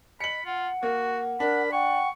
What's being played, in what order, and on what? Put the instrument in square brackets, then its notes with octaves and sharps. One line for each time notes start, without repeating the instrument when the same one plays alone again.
[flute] D#5 [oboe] B5 [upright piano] C#7 F#7
[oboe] F4 [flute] F#5
[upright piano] A#3 [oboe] F#4
[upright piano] D4 [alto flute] A#4 [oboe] B5
[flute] F#5 [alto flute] G5 [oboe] C#6